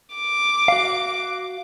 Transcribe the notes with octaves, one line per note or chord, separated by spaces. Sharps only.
D6
F#4 F5